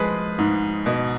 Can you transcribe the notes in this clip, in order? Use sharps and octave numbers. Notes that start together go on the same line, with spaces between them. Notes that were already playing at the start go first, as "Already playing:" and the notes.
Already playing: F3 G#3 G#4 B4
G#2
B2